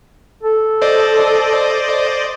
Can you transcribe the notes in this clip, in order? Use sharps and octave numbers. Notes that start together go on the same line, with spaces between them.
A4
C5 D5 D#5